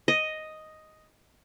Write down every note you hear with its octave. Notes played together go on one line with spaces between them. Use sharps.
D#5